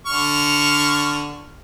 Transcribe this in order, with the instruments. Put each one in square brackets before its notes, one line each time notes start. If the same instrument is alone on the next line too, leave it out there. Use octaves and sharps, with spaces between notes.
[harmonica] D3 C#6 F6